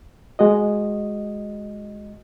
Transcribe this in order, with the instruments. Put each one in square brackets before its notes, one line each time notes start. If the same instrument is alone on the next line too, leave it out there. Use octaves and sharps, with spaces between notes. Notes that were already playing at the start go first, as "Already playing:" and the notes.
[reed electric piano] G#3 F#4 D#5